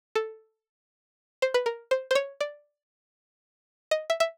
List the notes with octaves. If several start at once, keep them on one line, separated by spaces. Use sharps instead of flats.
A4
C5
B4
A#4
C5
C5
C#5
D5
D#5
E5
E5